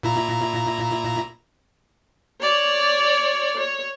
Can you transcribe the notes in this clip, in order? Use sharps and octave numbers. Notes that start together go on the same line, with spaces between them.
A#2 E4 A#5
C#5 D5
C#5